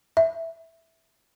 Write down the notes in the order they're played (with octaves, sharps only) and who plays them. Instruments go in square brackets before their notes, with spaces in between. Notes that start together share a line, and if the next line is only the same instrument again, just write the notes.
[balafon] E5